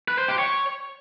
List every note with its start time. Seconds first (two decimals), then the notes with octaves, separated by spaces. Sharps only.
0.08 B4
0.18 C5
0.28 G4
0.38 C#5